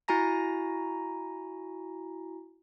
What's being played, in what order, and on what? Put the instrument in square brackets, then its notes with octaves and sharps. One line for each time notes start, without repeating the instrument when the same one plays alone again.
[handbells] E4 F#4 G#5 A#5 A#6